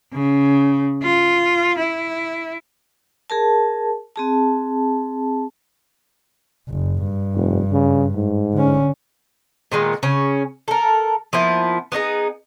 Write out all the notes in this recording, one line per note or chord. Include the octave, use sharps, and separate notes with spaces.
C#3
F4
E4
G#4 A#4 A5
C4 G#4 A5
F#1
G2
F1
C#3
G#2
D3 C#4
A#2 D#3 G#3 B3
C#3 C#4
A4 A#4
F3 A#3 B3 E4
B3 D4 D#4 G#4